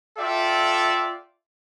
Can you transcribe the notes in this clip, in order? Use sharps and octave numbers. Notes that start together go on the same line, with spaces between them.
F4 A4 D5 E5 G5